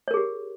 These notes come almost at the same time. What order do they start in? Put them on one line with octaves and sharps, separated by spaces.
C#5 A#4 G#4 G4